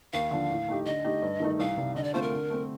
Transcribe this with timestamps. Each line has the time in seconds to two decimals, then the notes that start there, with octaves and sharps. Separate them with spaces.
0.13 D#2 F5
0.31 D3 F3
0.50 A2
0.68 A3 D#4 G4
0.86 D3 D#5
1.05 A3 D#4 G4
1.22 G2
1.40 D#3 A3 D#4
1.59 C2 F5
1.77 C3 G3
1.95 D3 D#5
2.04 D5
2.14 A3 C4 F4 C5
2.22 A#4
2.32 D3
2.50 A3 C4